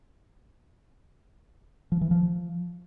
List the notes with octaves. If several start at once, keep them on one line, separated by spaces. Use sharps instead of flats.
F3
E3
F3